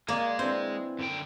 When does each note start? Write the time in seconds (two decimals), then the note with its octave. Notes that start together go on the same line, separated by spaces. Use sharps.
0.08 G#3 A#3 A#4 D5
0.39 E3 C4 D4 C5
0.99 F#2 D3 G5